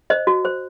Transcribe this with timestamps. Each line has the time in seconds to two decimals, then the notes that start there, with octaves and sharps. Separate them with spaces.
0.10 C5 D#5
0.27 F#4
0.45 C5